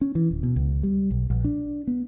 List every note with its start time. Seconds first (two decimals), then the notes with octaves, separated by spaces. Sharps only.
0.01 C#4
0.15 E3
0.31 D1
0.43 B2
0.56 C#2
0.83 G3
1.11 B1
1.30 A#1
1.44 D4
1.87 B3